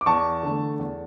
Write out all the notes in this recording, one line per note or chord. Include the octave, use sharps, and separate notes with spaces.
D6
E2 A5 C#6
D3 A3
E2